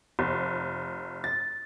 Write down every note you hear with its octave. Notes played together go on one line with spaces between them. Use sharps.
F1
A6